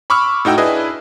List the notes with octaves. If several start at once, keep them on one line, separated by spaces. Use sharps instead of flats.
B5 C#6 D6 E6 F6
A2 D#4 F#4 G5 E6
D4 E4 G#4 B4 D#5